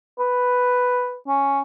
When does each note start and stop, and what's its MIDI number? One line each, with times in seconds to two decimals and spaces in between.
0.19 1.15 71
1.28 1.62 61